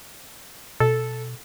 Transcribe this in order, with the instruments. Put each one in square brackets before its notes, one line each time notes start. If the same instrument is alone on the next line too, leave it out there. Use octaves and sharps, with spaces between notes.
[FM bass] B2 [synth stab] A4